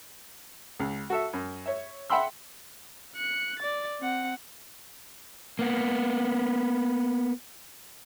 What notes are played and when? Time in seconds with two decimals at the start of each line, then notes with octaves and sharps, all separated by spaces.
0.80 C#2
1.10 F#4 A4 E5
1.33 F#2
1.66 C#5 E5
2.10 E5 F#5 G5 B5 C6 E6
3.16 F#6 C#7
3.59 D5 A6
4.01 C4 F#5
5.59 A#3 B3